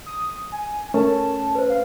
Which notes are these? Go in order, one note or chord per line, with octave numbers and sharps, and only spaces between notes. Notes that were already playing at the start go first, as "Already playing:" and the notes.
D#6
G#5
A3 C#4 A#4 A5
B4 C5
F5